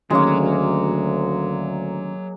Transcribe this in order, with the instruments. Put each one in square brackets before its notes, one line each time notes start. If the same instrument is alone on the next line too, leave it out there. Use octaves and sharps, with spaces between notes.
[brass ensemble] D2 [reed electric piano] D#3 C#4 [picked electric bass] F#3 [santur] G#3 A#3